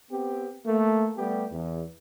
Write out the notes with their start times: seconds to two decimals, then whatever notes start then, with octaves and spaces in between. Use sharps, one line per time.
0.11 B3 C4 G4
0.66 A3 A#3
1.17 G3 A3 B3 G4
1.51 E2